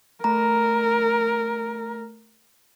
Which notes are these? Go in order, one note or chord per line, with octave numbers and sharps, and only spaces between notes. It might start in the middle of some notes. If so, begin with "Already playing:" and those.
A3 A#4 A#5